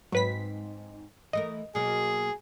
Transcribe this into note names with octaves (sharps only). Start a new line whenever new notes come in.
G#2 F#3 C4 B4 B6
E3 A3 A#4 D#5
B2 F#3 A#3 G#4